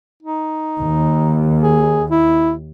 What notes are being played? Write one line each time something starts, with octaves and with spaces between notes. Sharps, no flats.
D#4
D#2
G#4
E4